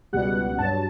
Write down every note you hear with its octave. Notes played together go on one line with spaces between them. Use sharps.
C#2 B2 G3 F#5
G2 F#3 A5